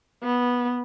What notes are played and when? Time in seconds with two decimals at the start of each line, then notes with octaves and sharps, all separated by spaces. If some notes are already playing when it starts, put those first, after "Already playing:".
0.23 B3